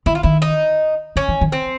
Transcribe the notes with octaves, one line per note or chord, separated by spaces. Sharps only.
D#3 E4
F4
D#3 E4
D#4
D3 C#4
E3
D#3
C4